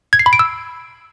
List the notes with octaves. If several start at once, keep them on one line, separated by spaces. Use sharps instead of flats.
G#6
C7
B5
D7
E6